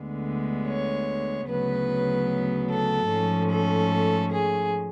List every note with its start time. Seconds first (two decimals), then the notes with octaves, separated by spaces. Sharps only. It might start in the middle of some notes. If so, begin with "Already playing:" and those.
Already playing: D2 D3 G#3 B3
0.69 C#5
1.49 D2 C#3 F#3 B3 B4
2.71 A4
3.10 G#2 F3 A3 C#4
3.51 A4
4.33 G#4